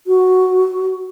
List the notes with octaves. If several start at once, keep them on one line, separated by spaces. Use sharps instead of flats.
F#4